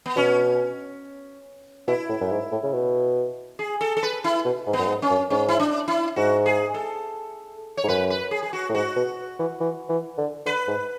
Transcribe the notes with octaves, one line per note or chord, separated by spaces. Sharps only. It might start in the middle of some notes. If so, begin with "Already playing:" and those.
B3
B2 C#4
B2 E4
A2
F#2
G#2
A2
C#3
B2
G#4
A4
A4
B4
E4
B2
G#2
B3
F#2
G#2
C#4
F#2
G#2 C#4
E4
D4
E4
G#2 F#4
G#4
A4
C#5
G#2
F#2 B4
B4
G#4
G#4
F#4
A2
G#2 F#4
B2
E3
E3
E3
D3
D3 B4
G#2